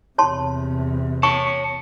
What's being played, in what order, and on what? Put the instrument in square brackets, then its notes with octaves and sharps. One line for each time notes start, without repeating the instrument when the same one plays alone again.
[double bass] E2 C3 [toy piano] C#5 A5 C6
[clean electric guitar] C#5 A5 [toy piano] C#6